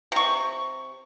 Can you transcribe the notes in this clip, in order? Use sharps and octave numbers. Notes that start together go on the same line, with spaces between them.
C3 C#6